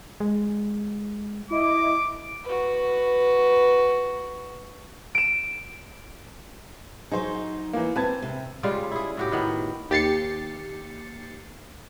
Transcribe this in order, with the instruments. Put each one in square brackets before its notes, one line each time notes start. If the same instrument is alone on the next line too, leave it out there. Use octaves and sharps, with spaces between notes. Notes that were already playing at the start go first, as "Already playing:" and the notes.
[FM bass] G#3
[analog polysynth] E4 D#5 [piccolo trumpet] D6
[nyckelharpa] F#4 B4
[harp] D7 E7
[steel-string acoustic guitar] F#3 D#4 [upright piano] G#4 C5
[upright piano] E3 A#3
[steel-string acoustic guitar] C4 [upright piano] B4 A5 G#6
[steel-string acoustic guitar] C3
[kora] C#3 G3 G#3 F4
E4 G#4
A2 F#4 G4
A2 D#3 B3
[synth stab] D#2 G4 A6 C7 C#7